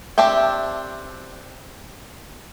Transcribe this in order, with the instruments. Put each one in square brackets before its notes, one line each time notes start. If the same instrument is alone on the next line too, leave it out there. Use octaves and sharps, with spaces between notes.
[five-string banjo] C4 D4 G4 E5 G5